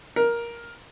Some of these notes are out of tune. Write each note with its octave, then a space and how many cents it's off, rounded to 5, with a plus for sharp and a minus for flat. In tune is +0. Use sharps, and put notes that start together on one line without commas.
A#4 +10